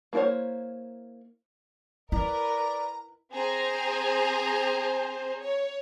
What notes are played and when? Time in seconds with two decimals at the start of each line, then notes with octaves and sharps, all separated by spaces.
0.13 A#3 E4 A#4 C5 C#5
2.12 E4 A#4 B4 D5 A#5
3.33 C4 G#4 C5 G#5 A#5
5.40 C#5